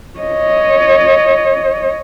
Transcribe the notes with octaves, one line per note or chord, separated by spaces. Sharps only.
C#5 D#5